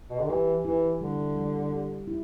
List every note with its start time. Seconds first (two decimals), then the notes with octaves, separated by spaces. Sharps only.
0.10 B2
0.20 D3
0.29 E3 G4
0.65 E3 E4
1.01 D3 G3
1.36 G3
1.72 G4
2.08 E4